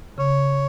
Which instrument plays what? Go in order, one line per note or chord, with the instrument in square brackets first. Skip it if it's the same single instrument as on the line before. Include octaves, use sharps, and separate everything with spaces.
[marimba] C#3 [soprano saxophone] C#5